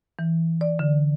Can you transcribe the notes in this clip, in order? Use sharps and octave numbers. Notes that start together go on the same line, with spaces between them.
E3
D5
D3